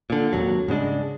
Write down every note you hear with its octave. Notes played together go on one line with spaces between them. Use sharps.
A#2 D3
G#1 D#2 F#3
G#2 C#3 G#3 D4